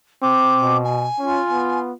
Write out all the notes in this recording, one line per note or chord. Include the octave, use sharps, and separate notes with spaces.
C4 D6
B2
G#5
C#4 F4
B3